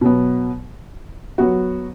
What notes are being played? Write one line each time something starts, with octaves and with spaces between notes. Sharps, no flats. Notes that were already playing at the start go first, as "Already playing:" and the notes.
B2 F#3 B3
F#3 B3 F#4